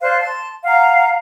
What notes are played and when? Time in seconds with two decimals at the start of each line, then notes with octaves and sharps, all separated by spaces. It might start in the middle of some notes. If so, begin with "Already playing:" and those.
0.02 C5 D5 F5 F#6
0.20 A5 C6
0.65 F5 F#5 A#5